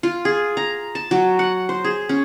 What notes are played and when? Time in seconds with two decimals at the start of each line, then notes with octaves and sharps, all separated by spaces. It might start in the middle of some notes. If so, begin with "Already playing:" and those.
0.03 F4
0.25 G#4
0.57 A#5
0.95 A5
1.11 F#3
1.39 F#5
1.69 C5
1.84 G#4
2.09 C#4